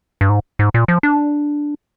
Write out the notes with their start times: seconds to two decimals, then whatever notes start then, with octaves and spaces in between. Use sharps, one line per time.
0.21 G2
0.30 G#2
0.59 G#2
0.74 A#2
0.88 F3
1.03 D4